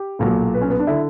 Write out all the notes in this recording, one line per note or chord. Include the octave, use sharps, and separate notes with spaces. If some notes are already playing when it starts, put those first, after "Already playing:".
Already playing: G4
B1 A#2 F#3
B4
C#4
B3
D4
D3 E4